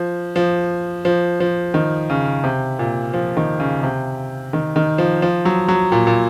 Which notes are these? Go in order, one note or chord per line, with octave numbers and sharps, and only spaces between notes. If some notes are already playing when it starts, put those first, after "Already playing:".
Already playing: F3
F3
F3
F3
D#3
C#3
C3
A#2
F3
D#3
C#3
C3
D#3
D#3
F3
F3
F#3
F#3
A#2
A#2